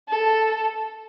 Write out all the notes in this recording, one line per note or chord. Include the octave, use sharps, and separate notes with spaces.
A4